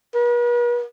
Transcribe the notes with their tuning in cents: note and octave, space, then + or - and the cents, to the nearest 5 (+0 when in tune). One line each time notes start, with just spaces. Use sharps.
B4 -45